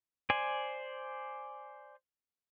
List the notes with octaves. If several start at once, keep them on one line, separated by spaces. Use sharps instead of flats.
C5 D5 G#5